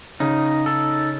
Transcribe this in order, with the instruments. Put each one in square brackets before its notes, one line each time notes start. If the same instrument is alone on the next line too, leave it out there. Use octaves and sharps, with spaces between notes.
[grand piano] C#3 C#4 [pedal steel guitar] D#4
[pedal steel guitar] A4